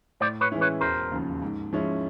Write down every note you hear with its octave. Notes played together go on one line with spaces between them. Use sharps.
A2 C5 D5
B4 C#5
E3 G#3 C#4 E4
B4 C#5
E1 A#4 C5
D#2 C#3 F3
G#2
F3 G#3 C#4 E4